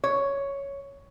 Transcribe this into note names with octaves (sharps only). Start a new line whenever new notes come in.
C#5